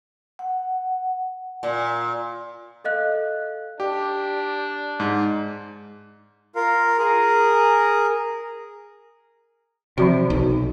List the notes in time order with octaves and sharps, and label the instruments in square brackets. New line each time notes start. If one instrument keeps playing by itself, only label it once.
[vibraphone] F#5
[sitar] A#2
[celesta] A4 D#5 F5 F#6
[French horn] D4 [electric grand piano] G4
[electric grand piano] G#2
[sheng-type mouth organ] F4 A#4 F5
G#4 A#4
[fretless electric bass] C3 [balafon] E3 F3 F#4
[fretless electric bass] B1